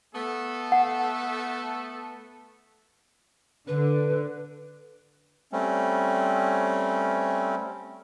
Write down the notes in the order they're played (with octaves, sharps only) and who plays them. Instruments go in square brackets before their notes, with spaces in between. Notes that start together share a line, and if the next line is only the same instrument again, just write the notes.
[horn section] A3 B3 A4
[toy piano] F#5
[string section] D3 [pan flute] B4
[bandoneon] G3 A3 C4 C#4